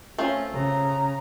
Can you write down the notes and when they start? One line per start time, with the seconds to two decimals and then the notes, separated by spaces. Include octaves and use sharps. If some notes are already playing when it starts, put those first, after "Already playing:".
0.18 A3 C4 C#4 F4
0.53 C#3 A#5